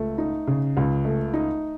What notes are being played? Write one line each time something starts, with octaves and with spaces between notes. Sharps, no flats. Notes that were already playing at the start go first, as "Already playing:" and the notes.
Already playing: C#2 A3
D#4
C#3
C#2
A3
D#4